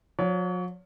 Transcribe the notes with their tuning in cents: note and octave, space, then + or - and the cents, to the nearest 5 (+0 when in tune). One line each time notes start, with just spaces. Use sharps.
F#3 -45 C#5 +35